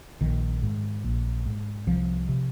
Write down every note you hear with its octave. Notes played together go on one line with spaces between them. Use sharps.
A#1 D#3
G#2
A#1
G#2
C2 F3
C3